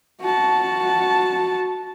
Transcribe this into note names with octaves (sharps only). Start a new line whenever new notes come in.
F#4 A5